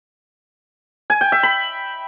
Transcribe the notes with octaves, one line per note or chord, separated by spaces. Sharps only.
G#5
G5
E5
B5